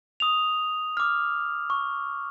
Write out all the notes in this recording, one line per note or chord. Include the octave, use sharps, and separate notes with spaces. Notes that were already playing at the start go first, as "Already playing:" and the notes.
D#6 F7
D6 F6
C#6